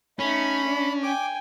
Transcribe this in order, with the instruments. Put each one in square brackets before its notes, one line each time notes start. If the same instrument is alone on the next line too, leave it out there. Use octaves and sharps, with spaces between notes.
[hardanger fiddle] A3 D#4 [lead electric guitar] C#4 [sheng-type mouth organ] B5
[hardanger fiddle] D4
[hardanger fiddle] G5 G#5 [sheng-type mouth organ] D6